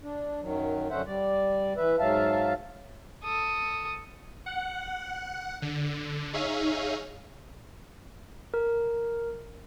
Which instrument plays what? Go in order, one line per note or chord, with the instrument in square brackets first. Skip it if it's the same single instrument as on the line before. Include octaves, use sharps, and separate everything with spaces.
[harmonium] D4
F#2 D#3 F#3
F#2 D3 C#4 C5 E5 F#5
G3 D5
E3 B4 E5
G#2 F#3 E5 F5 A5
[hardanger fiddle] A4 D#6
[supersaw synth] F#5
D3
D#4 G#4 C#5 E5 F5
[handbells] A#4